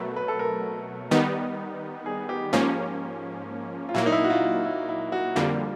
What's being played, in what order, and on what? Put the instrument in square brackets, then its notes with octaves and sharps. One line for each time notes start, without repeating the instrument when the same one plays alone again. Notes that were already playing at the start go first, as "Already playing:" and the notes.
Already playing: [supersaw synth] B2 F#3 A3 [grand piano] A#4 B4
[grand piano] B4
A4
A#4
[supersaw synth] D#3 G3 B3 D#4
[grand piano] G#4
G4
[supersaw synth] G#2 F3 A#3 C#4
[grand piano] F4
[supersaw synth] A#2 F#3 A#3 [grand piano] E4
[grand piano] D#4
E4
F#4
F4
E4
E4
F#4
[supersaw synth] F2 D3 G3 A#3 [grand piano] F4